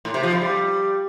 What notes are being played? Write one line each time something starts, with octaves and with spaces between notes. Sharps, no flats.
A2
C3
F3
F2
G3